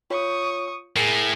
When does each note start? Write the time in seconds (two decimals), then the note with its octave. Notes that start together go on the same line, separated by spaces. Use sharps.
0.10 F4 C#5 C#6 D#6
0.96 A2 G#4 A#4